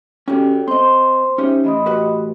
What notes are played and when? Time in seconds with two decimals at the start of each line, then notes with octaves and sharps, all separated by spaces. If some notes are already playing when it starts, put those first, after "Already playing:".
0.28 C#4 F#4 G4 A4 C#5 G5
0.68 C4 C5 D#5 C6
1.38 C#4 D#4 G4 E5
1.64 A2 E3 D#5 B5 D#6
1.86 F#4 G4 B4